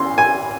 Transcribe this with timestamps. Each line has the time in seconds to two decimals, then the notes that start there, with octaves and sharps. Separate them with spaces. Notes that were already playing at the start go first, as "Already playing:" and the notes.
Already playing: E2 E3 C#4 C6
0.18 G#5